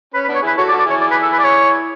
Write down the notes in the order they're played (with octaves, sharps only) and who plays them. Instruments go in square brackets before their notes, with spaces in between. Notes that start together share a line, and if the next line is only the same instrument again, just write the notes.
[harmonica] C#4 [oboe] B4
[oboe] B4
[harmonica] B3 D4
[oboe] C#5
[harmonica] E4 G#4 [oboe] B4
[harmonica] F#4 A4 [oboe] C#5
[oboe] D5
[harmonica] F#4 A4
[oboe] D5
[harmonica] E4 G#4 [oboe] C#5
[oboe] D5
B4
A4
B4
D5
C#5